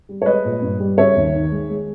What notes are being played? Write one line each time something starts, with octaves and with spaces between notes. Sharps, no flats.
G3
C#5
G#3 B4 D#5
A#2
G2
G3
C#3 C#5 E5
D#2
D#3
G#3
G#3